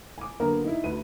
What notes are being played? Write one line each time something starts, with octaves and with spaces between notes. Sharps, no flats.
G#5 D6
D3 F#3 A#3 B3 A#4
D#4 E4
D2 B4 D#7